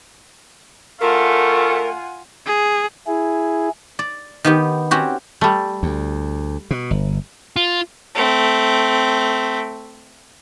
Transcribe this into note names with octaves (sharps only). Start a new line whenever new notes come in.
D2 A3 F4 A#4 F#5 G#5
G#4
E4 G#4
D5
D#3 B3 G4
C4 C#4 F#4 G4
G3 A3
D2
B2
G1
F4
A3 C4